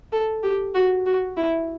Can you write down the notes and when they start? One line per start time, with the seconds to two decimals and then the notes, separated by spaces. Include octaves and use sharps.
0.12 A4
0.43 G4
0.74 F#4
1.06 F#4
1.37 E4